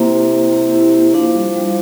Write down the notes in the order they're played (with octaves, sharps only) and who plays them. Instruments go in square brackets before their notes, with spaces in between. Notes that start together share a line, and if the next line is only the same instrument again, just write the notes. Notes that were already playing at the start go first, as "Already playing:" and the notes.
Already playing: [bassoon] C3 [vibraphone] A#3 E4 G4
[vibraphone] A#3
E4
G4
E4
E4
[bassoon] F3 [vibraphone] D4
[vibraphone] G3
G3